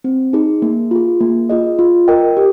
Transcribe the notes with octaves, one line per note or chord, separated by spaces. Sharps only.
C4
D#4 G#4
A#3
F4 G#4
A#3
F4 G#4 D#5
F4
A#4 D#5 G5
G4